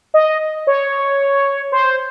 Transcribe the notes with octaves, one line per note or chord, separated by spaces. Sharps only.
D#5
C#5
C5